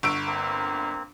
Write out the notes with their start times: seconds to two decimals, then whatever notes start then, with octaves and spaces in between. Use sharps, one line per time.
0.03 G1 F#4 E6 D7
0.27 A#3 C4